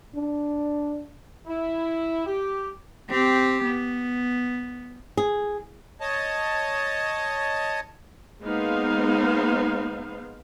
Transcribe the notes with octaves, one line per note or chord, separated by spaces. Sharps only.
D4
E4
G4
C4 G4
B3
G#4
C#5 D#5 A5
G#3 A#3 B3 D#4 C5 F5